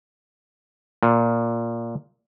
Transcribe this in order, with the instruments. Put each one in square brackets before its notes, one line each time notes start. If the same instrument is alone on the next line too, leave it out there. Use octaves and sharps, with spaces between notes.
[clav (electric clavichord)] A#2